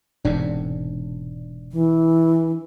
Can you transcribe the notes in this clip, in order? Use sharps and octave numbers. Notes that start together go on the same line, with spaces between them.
E1 G#2 C3 D4
E3